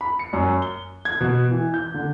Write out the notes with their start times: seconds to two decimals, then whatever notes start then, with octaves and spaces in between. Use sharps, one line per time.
0.01 B5
0.19 C#7
0.33 F#2
0.62 G7
1.05 G#6
1.20 B2
1.51 E3
1.74 G6
1.94 D3